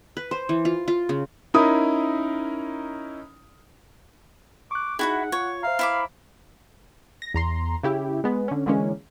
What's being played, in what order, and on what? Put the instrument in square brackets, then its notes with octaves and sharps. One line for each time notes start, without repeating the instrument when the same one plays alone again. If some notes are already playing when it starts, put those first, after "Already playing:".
[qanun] B4
C5
E3
F4
F4
C#3
[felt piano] C#4 D#4 E4 A#4 B5 D#6
[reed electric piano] C#6 F#6 [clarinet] D6
[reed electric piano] D#4 G#4 [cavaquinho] E4 F#4 B5 [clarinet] F#5
[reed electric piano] F4 [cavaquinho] C#5
[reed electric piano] C5 E5 A#5 [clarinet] F5
[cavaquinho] E4 B5 D6
[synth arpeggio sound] A#6
E2 A#5 C6
C#3 E4 G4
G#3 B3
D3 C#4
D3 E3 G#3 A#3 C#4